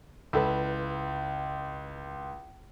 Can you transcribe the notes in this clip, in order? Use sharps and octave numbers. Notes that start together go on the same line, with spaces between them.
C#2 E4 A4 B4